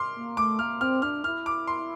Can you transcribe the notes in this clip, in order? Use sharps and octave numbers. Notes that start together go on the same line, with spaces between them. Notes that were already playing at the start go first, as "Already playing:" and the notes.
Already playing: C6 D6 F6
A#3
A3 D6
A#3 F6
C4 F6
D4 F6
E4 F6
D6
C6